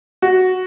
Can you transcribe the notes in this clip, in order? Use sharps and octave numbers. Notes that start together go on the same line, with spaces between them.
F#4